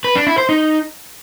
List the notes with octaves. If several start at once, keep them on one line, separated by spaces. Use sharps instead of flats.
B4
D4
E4
C5
D#4